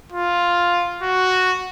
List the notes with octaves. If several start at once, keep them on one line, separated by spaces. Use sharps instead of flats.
F4
F#4